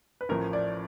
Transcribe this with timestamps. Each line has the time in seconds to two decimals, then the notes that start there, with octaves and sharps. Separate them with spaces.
0.21 B4
0.29 A1 A2 F3 A#4
0.53 D5